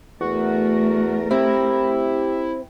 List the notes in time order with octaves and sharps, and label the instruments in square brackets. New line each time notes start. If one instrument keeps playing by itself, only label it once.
[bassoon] E2 [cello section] A3 A#4 [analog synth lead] F#4
[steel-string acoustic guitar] C4 [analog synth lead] E4 [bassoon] G4